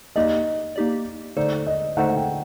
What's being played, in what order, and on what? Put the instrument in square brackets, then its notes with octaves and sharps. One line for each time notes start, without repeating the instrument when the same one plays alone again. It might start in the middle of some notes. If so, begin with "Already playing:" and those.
[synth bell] A#3 D#4 G4 D5 [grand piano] D#5
[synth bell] A#3 D#4 G4 D5
[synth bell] D3 A3 D#4 A4 C5 [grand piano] D5
[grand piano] D#5
[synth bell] D3 A3 D#4 A4 C5 [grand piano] F#5
[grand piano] F#5
G5